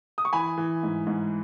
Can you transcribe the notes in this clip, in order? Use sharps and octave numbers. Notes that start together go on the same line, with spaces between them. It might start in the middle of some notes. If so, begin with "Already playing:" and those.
D#6
C#6
E3 G#5 B5
E3
G#2
G#2